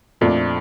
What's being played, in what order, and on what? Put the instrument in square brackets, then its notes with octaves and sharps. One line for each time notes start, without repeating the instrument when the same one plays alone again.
[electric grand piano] F2 [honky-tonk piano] A#2 F3 A3 D4 F4